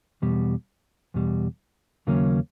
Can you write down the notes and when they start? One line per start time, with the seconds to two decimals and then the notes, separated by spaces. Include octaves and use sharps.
0.22 E2 B2 G3
1.14 E2 B2 G3
2.07 D#2 C#3 F#3 A#3 C#4